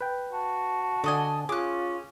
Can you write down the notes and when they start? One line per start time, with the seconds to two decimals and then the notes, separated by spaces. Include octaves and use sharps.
0.01 B4 G5
0.32 F#4 A5
1.04 D3 D4 D5 D#5 G#5
1.49 C#4 F4 G#4 D6 F#6